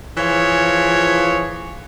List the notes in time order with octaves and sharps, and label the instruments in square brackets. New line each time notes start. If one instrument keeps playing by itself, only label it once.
[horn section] E3 F3 F4 G#4 C#5